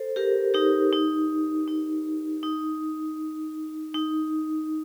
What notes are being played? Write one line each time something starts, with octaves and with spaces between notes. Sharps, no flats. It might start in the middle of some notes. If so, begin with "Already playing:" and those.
Already playing: A4 C5
G4 A#4
D#4 G4
D#4
D#4
D#4
D#4